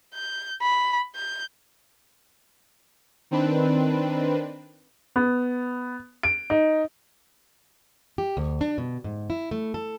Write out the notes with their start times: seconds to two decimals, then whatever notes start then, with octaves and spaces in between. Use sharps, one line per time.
0.14 G6
0.61 B5
1.16 G6
3.31 D#3 C4 D4 B4
5.16 B3
6.23 D7
6.50 D#4
8.18 G4
8.37 D2
8.61 D4
8.78 B2
9.04 G#2
9.30 E4
9.51 A3
9.74 A4